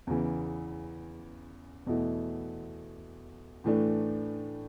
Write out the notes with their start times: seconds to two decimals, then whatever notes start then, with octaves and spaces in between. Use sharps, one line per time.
0.07 E2 C#3 E3
1.86 E2 B2 A3 E4
3.64 A2 E3 A3 D4